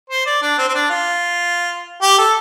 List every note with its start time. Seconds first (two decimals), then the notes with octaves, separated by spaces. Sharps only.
0.10 C5
0.26 D5
0.42 D4
0.58 C4
0.68 C4
0.74 D4
0.90 F4
2.02 G4
2.18 A4